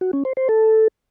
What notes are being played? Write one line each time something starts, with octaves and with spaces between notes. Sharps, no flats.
F#4
C#4
C5
C5
A4